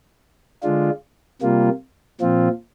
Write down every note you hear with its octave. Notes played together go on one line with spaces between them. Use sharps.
D3 G#3 D4 F4
C3 G3 A#3 F4
A#2 F3 C4 F4